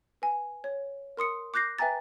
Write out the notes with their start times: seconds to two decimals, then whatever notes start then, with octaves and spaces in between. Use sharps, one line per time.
0.22 B4 G#5
0.64 C#5
1.17 A#4 C6 D#6 C#7
1.54 D6 F#6 G6 A#6 C7
1.79 B4 E5 G5 G#5 A#5 A6